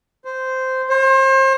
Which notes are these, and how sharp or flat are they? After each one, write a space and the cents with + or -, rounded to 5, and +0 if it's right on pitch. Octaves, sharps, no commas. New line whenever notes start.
C5 -10
C5 +35